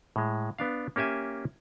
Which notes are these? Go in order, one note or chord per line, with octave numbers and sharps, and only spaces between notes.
A2 G#3
B3 D4 F5
A#3 C#4 G4 E5 G#5